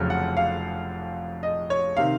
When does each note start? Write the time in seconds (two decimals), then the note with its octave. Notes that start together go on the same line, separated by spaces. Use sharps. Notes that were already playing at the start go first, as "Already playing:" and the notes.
Already playing: F1 F2 C#3 F#3 F6
0.10 F#5
0.37 F5
1.43 D#5
1.70 C#5
1.97 C3 D#3 F5